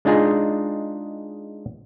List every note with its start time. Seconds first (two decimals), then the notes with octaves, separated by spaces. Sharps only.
0.05 G#3 D4 D#4 F4 G#4